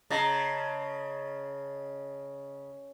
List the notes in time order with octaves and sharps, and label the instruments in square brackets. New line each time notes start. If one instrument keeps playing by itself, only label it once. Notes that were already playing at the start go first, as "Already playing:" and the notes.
[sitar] C#3 [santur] D#5 A5 A#5